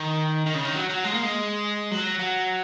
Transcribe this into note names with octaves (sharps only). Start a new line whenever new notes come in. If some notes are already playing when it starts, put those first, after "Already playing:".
Already playing: D#3
D#3
C#3
D#3
F#3
F#3
G#3
A#3
G#3
F#3
F#3